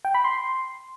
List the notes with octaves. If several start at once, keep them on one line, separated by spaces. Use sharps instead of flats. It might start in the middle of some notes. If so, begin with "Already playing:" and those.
G5
B5
C6